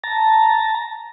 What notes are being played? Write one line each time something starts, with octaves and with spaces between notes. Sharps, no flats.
A5 A#5